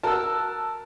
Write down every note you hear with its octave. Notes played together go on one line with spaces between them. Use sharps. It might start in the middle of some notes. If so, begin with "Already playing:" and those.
F#4 A#4 A5 E6